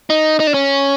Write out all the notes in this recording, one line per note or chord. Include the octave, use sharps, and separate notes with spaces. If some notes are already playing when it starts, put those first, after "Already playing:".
D#4
D#4
D4
C#4